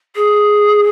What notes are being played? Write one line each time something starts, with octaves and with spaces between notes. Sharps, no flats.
G#4